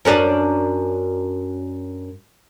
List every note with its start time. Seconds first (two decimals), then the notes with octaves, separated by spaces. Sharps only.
0.05 F#2 C#4 D4